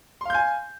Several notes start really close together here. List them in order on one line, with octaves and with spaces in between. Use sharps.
C6 F5 G6 G#5